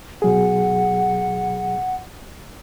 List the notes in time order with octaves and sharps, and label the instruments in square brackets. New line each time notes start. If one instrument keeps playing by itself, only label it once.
[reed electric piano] B2 F#3 G#4 [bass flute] F#5